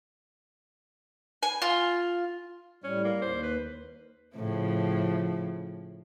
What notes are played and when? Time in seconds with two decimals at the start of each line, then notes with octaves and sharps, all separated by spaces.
1.43 G#5
1.62 F4
2.84 A2 G3 C#4
3.05 A#3
3.22 D#2 C5
3.43 B4
4.36 A2 C#3 F3